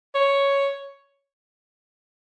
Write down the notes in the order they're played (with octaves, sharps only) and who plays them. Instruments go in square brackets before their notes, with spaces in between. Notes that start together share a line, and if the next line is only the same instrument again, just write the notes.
[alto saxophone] C#5